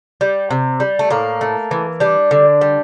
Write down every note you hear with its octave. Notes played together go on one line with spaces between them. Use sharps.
G3
C3
G3
A3
A2 A#3
A3
E3
G3 D4
D3
G3